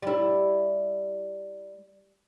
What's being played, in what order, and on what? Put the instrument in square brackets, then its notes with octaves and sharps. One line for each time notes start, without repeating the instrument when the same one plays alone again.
[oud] G3 E4